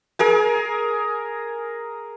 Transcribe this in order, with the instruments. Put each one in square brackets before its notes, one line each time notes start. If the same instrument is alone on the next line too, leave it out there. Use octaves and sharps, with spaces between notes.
[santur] G#4 A#4 G#5